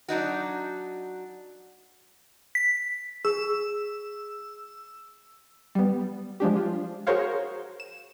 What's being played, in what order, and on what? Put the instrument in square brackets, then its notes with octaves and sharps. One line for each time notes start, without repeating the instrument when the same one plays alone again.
[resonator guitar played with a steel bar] F#3 D4 D#4 F#4
[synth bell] B6
[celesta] G#4 [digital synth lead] E6
[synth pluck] G3 B3
F3 G#3 D4 G4
F4
F#4 G#4 A#4 C5 C#5 F5
E7